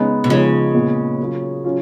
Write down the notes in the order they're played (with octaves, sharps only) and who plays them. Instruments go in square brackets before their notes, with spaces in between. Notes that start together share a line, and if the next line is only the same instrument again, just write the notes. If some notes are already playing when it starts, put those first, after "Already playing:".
Already playing: [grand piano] C#3 G#3 B3 D#4
[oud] B2
[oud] C#3 [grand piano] F3 G#3 B3 D#4
[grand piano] A#2 G#3 B3
F#3 A#3 F4
F#3 C#4 F4